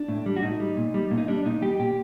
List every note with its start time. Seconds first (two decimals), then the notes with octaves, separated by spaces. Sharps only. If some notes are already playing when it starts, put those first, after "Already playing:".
Already playing: D4
0.08 A2
0.26 G3
0.36 F#4
0.43 A2 D#4
0.60 G3
0.77 A#2
0.94 G3
1.11 A#2
1.18 D#4
1.28 G3 D4
1.45 A#2 D#4
1.62 G3 G4
1.80 A#2 G4